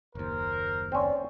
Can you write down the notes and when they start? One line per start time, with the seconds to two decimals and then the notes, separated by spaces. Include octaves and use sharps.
0.15 F#1 D#2 A#4 C5
0.92 C4 C#4 D5